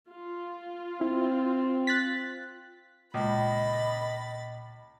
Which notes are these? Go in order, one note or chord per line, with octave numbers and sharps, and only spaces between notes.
F4
C4 E4
F#6 A6 B6
C#2 A#2 D#5 B5 A6